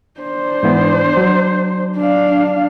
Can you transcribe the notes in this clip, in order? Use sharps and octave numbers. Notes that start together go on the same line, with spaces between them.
D4 C5
G#2 E3 B3
F#3
D4 F5